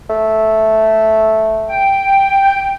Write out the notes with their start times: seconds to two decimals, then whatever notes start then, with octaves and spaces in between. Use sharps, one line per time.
0.10 A3
1.70 G5